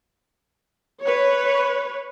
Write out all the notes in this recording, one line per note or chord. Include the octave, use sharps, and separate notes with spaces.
B4 C#5